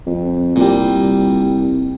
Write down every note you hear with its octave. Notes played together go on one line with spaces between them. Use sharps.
F2
C2 A#2 G3